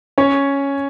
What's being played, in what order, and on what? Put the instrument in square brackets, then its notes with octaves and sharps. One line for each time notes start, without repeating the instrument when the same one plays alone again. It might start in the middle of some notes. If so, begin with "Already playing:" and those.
[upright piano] C#4 C#5